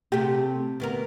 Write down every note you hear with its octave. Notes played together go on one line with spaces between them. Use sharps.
C3 A3 G4
D2 B3 A#4